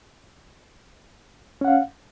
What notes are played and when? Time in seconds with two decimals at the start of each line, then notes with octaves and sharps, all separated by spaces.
1.61 C#4
1.65 F#5
1.68 F5